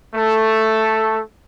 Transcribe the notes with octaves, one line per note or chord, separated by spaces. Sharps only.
A3 A4